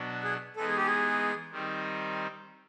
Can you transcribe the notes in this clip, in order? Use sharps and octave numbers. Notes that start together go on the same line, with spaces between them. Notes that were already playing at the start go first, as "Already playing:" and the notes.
Already playing: B2 F#3 B3 D4
G#4
E3 G#3 B3 D#4 A4
G#4
G4
G#4
D#3 G3 C4 D#4